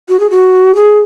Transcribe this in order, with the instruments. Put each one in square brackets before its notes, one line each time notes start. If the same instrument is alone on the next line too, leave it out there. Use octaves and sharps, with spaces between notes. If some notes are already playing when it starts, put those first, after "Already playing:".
[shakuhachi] F#4
G#4
F#4
G#4